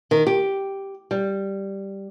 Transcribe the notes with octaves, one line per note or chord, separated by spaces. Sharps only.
D#3
G4
G3